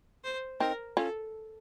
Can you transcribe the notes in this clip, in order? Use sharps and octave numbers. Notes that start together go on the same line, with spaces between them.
C5
C4 D#4 A#4
C#4 F4 A4